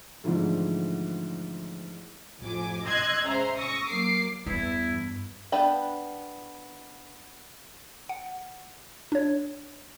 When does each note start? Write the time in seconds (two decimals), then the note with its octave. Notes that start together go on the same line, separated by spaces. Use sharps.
0.24 G#2 D3 E3 F3 A3
2.39 A1 F2 G#5 D6
2.85 D#5 C6 E6 F#6 G#6
3.24 G#3 C#4 C5 E5 A#5 C6
3.58 C#6 D#6 E6 A#6
3.88 F#3 A#3 D6 C7
4.46 E2 G2 E4
5.52 B3 D4 B4 G5
8.09 F#5
9.12 D4 C#5